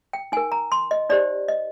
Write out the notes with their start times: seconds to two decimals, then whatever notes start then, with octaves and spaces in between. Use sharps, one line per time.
0.13 G5
0.32 D#4 G#5
0.37 A#4
0.52 A#5
0.72 C6
0.91 D#5
1.09 D#4 G4 C5 D5
1.48 D#5